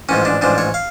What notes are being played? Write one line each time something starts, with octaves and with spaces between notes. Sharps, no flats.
A1 G#2 F3 C#4
D4
A1 G#2 F3 D4
C#5
F5